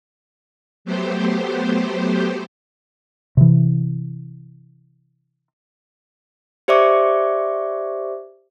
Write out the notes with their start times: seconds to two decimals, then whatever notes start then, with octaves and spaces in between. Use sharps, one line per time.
0.85 F#3 A3 B3 G4 C5
3.37 C3 E3
6.68 G4 C5 D5 E5 C#6 D6